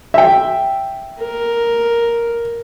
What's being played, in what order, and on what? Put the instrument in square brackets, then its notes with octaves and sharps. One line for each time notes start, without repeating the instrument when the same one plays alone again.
[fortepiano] E5 G5
[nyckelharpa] A#4